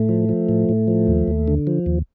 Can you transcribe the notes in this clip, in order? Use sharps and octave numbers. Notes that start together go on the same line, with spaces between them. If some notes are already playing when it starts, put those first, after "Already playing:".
Already playing: A2 A3
F3
F3
A2
A2
F3
D#2
D#2
D3
F3
D#2